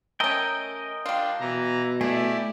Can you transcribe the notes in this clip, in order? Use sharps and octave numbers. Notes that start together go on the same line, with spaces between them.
A3 C#4 A#4 D#5 G5
G3 D4 F4
B2 E3 A#5
A3 E4 G4 G#4 D5